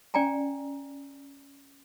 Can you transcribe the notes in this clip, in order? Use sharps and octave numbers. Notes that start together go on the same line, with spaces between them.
C#4 D5 G5 G#5 A#5